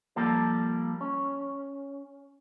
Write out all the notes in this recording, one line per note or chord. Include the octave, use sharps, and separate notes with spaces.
F3 G3 A#3 A4
C#4